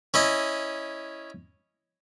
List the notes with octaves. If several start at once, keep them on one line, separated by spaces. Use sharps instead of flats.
C#4 E4 D#5